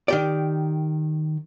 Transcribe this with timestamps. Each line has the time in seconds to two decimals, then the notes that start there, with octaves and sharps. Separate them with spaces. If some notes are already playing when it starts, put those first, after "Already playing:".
0.08 D#3 G4 D5